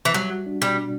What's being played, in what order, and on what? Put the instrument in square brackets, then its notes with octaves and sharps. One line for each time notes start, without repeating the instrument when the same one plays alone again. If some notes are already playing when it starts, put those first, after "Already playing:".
[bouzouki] E3
[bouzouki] F#3 [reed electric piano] G3
[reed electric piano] F#4
D4
[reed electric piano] B2 [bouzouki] G3
[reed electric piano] D4